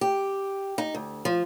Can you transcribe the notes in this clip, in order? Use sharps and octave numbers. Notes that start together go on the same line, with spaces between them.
G4
D#4
D2
F3